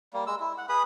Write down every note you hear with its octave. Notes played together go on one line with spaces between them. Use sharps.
G3 A#3
G#3 E6
E4
F#5
G#4 B4 B5 D#6